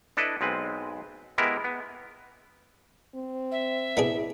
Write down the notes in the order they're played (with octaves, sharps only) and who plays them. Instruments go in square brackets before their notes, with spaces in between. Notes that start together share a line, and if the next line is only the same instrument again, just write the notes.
[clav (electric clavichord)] D4 E4 A4 B4 D#5
B1 G#3 C4 B4
G#3 B3 E4 G4 A#4
B3
[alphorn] C4
[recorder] E5
[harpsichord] B3 D4 G#4 [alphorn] E4